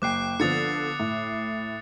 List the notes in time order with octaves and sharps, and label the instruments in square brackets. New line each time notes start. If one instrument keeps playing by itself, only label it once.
[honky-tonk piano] F#1 G5 [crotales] D6 F#6 C7
[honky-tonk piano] D3 F3 B3 [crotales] D#6 A6 C#7
[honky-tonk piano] A2